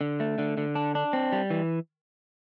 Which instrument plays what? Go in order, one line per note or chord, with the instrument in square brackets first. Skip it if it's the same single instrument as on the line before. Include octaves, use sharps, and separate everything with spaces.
[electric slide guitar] D3
A3
D3
D3
D4
D4
C4
G3
E3